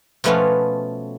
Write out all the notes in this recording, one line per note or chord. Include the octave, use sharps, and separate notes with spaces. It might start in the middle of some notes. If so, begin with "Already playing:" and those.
B2 F3 A3 B3 C#4 F4